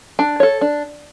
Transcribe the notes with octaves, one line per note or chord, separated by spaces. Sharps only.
D4
A4 C#5
D4